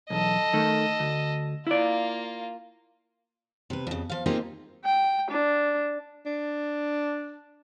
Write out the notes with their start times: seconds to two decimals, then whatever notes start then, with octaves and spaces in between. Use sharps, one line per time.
0.10 B1 E2 A4 D#5
0.53 D#3 A3
1.00 D2
1.67 A#3 E4 F4 D5
3.70 C3 B4
3.87 F2 C#3
4.10 F3 F5
4.26 A#3 C4 D#4 F4 G4 G#4
4.85 G5
5.31 D4
6.26 D4